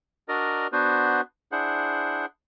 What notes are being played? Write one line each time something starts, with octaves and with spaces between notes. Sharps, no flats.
D4 F#4 A#4 D5 D#5 A#5
B3 D4 F#4 B4 C5
D4 E4 G#4 C5 F#5